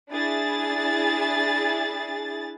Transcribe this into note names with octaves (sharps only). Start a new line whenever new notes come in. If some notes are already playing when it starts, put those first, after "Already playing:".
D4 E4 G#4 A6